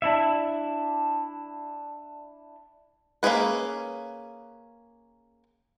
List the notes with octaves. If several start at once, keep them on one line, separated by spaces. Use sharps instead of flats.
D4 E4 E5
A#3 B3 C#4 G#4 B4